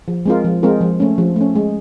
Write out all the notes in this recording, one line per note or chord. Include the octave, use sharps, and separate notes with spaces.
F3
G#3 C4 F4 A#4
F3
G#3 C4 F4 A#4
F3
A3 C#4
F3
A3 C#4
G#3